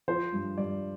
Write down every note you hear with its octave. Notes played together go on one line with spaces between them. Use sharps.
F3 C5
G2
G2 D5